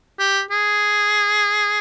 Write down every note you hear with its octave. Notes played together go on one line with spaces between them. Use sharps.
G4
G#4